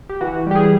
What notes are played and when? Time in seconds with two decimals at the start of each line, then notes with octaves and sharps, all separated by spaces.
0.09 G4
0.21 E3 F#4
0.47 G3 G4
0.56 G#4